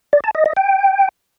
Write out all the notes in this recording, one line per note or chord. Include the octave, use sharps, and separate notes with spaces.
D5
A5
D#5
D#5
G5